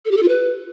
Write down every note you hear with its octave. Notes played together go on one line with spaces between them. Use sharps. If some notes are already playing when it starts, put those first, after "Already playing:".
A4
G4
A4
F4
B4